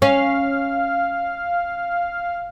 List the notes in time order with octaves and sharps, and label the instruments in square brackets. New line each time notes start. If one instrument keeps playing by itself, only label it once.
[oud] C#4 [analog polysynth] F5